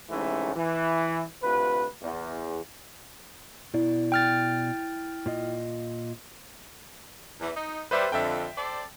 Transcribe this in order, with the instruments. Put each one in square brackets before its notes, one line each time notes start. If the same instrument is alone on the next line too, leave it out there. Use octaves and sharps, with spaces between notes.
[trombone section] A1 G#2 C3 E3 A3 C#4
E3
D2 C3 F4 B4
E2
[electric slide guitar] B2 D5 [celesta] E4
[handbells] G5 F6 A6
[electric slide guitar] A#2 F4 D#5
[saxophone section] E2 E3
D#4
[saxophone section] G3 [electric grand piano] B4 C5 E5
[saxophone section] F2 D3 [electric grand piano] E5 G5
[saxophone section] A4 C5 D5